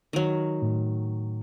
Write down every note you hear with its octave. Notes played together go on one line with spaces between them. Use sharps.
D#3 F#3
A2